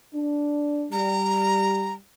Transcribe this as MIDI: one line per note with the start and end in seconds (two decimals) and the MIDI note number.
0.14 0.87 62
0.92 1.97 55
0.92 1.93 82